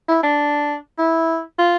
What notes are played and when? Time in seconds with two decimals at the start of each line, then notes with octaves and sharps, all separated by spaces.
0.09 E4
0.23 D4
0.99 E4
1.59 F4